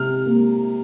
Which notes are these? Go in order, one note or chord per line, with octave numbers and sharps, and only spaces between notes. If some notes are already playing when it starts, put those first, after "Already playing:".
Already playing: C3 F6
A#3